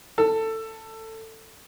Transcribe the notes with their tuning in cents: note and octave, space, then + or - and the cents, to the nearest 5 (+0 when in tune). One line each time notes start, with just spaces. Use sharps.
A4 +15